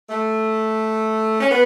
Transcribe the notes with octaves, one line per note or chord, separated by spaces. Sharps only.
A3
C#4
B3